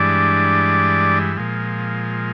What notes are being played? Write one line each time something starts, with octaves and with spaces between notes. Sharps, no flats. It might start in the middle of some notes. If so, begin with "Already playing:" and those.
Already playing: G2 E3 G#3 D4 D5
A#2 F3 G#3